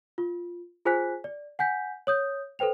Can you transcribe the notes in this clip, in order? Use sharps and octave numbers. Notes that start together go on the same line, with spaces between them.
F4
F4 G#4 C5 G#5 F#6 B6
D5
F#5 G#5 G6 B6
C#5 D#6 G6
A4 B4 C5 G5 F7